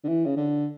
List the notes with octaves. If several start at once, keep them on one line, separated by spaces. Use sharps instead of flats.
D3
E3
C#3
D3